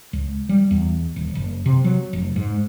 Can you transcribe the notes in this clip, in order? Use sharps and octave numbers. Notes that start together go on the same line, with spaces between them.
C#2
G3
E2
D#1
F#1
C3
F#3
F1
G#2